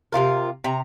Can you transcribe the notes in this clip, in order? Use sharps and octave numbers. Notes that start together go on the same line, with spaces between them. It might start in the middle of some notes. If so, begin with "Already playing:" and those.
C3 D#3 F4 A#4
C3 A#5